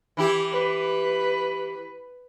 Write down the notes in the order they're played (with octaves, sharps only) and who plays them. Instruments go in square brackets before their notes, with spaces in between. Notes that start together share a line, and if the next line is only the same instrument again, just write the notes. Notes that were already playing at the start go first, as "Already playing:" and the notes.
[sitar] E3 E4 G4
[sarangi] B4